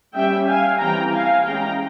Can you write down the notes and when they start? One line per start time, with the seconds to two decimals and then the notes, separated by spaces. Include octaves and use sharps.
0.16 G3 C#4 E5 G5
0.48 F5 G#5
0.80 E3 G3 C4 G5 A#5
1.13 F5 G#5
1.45 E3 G#3 C#4 G5 A#5